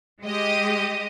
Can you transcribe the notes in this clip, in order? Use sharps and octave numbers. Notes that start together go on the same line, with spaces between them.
G#3 G4 D#5